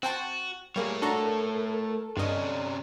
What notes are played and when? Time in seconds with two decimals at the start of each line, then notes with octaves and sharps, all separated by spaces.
0.03 C4 F#4 G5 A5
0.76 G3 A3 A#3 G#4 A#4 C#5
1.02 D4 F#4 A4 A#5
2.17 G2 C3 C#4 D5 D#5